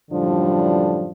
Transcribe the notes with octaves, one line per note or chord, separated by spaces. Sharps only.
F#2 A2 D3 F3 G3 D4